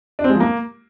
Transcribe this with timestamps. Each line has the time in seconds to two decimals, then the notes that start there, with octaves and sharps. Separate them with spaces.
0.19 D4
0.24 C4
0.30 G#3
0.35 F3
0.40 A#3